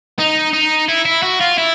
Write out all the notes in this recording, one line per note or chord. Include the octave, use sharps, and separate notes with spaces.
D#4
D#4
E4
E4
F#4
F4
E4